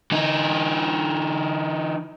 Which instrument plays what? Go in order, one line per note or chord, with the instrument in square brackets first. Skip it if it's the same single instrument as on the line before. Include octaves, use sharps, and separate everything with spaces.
[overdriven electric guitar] E3 D#4